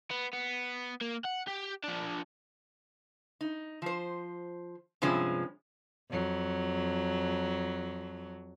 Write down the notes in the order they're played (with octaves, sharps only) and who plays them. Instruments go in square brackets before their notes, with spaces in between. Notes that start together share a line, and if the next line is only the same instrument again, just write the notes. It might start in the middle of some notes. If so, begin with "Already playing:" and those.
[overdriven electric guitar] B3
B3
A#3
F#5
G4
F3 D4
[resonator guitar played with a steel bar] D#4
F3 C5
G2 C3 F3 G#3 C#4
[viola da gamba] F2 F#3